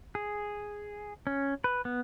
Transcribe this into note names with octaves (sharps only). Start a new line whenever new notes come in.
G#4
C#4
B4
B3